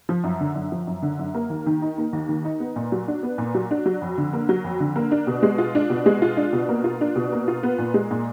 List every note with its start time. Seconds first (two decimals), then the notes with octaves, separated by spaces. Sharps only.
0.09 F3
0.24 F#2
0.40 D3
0.55 F#2
0.72 F3
0.87 F#2
1.02 D3
1.19 F#2
1.34 A#3
1.50 D#2
1.66 D#3
1.82 D#4
1.98 A#3
2.13 D#2
2.29 D#3
2.45 D#4
2.60 B3
2.76 A#2
2.92 F#3
3.08 D4
3.23 B3
3.38 A#2
3.55 F#3
3.71 D4
3.86 F#3
4.02 F2
4.18 D3
4.33 A#3
4.49 F#3
4.64 F2
4.80 D3
4.96 A#3
5.11 D4
5.27 B2
5.43 G#3
5.58 F4
5.75 D4
5.90 B2
6.06 G#3
6.22 F4
6.37 D4
6.53 B2
6.69 A#3
6.84 F4
7.01 D4
7.16 B2
7.32 A#3
7.48 F4
7.63 B3
7.78 A#2
7.94 G#3
8.11 A#2